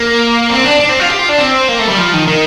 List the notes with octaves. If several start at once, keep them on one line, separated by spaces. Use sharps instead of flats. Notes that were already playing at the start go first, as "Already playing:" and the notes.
Already playing: A#3
C4
D4
D4
C4
F4
G4
F4
D4
C4
A#3
A3
G3
F3
D#3
D#3